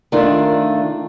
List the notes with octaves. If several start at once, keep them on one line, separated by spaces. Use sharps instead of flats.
D#3 A3 D4 F4